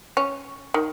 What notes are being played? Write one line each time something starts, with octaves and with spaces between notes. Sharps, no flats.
C#4
D#3